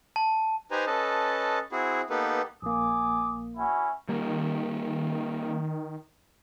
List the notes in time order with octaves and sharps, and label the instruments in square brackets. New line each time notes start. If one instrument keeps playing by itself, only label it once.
[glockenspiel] A5
[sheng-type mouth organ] D#4 G4 B4 C5 G#5 A#5
C#4 A4 B4 D#5 A5
C4 E4 F#4 G#4
A#3 B3 D#4 G4 A4 B4
[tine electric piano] A#1 A#3 [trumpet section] G#5 D6 D#6
[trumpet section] C#4 E4 F#4
[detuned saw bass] D#3 [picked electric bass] G3 A#3